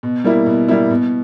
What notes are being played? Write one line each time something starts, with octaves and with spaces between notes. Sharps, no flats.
B2
G3 A#3 E4
B2
G3 A#3 E4
B2